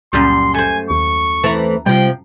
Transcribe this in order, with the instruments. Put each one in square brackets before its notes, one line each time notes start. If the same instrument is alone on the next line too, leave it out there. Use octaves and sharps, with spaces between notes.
[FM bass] C#2 [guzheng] F#2 A#2 G3 [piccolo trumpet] C6
[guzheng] A3 C5 [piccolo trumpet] G#5
[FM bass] D#2 [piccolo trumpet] C#6
[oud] E3 A3 C4 [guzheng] A5 A#5
[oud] C3 F3 [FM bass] G3 [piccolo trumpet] G5